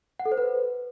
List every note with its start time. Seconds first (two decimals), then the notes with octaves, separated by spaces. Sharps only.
0.20 F#5
0.26 A4
0.32 C5
0.38 B4